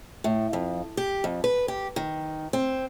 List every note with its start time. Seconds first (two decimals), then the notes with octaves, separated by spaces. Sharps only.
0.24 A2
0.53 F2
0.97 G4
1.24 F2
1.44 B4
1.68 G4
1.96 D#3
2.53 C4